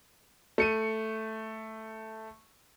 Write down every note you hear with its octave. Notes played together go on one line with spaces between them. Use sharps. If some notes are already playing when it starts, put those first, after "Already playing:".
A3 C#7 D#7